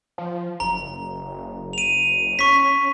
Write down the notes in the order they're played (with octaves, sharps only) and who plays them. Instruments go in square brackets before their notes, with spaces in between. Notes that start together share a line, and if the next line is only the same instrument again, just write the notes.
[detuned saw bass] F3
[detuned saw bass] F#1 [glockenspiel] A#5
[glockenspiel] D#7 F7
[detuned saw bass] C#4 [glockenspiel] C#6 B6